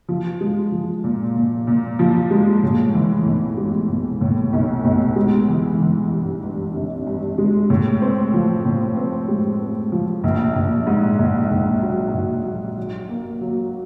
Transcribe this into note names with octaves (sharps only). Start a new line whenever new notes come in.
F3
G#3
F3
A#2
A#2
A#2
F3
G#3
A2
E3
B1
G#3
B1
A2
B1
B1
G#3
E3
E3
G2
G2
G#1
G2
G#3
A2
C4
F3
A2
C4
G#3
C4
F3
A#1
A#1
G#2
A#1
A#1
F#3
A#1
F#3
F#3
A#3
F#3